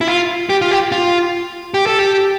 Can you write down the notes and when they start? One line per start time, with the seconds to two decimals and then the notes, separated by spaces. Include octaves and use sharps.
0.01 E4
0.08 F4
0.50 G4
0.62 F4
0.71 G4
0.92 F4
1.74 G4
1.86 A4
1.99 G4